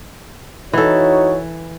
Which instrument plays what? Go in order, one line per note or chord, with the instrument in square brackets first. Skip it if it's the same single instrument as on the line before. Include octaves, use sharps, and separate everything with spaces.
[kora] E3 A4 [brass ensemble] D#4 F#4 C#5